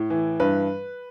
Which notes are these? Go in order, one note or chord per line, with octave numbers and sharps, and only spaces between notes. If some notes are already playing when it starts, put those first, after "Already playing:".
Already playing: A2
E3
G2 B4